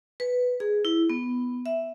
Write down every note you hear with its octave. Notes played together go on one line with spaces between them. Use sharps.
B4
G#4
E4
B3
E5